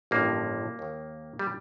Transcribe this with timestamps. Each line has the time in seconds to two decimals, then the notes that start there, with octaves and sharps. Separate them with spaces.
0.11 A1 G2 D3 F3 A#3
0.79 D#2 D#3
1.39 G3